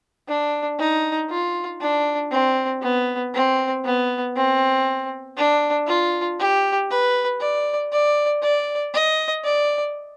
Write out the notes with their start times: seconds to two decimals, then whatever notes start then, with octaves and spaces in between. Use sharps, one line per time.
0.28 D4
0.79 D#4
1.30 F4
1.81 D4
2.32 C4
2.82 B3
3.34 C4
3.84 B3
4.36 C4
5.37 D4
5.87 F4
6.39 G4
6.90 B4
7.40 D5
7.92 D5
8.42 D5
8.94 D#5
9.44 D5